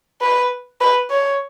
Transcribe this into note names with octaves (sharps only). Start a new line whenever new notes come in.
B4
B4
C#5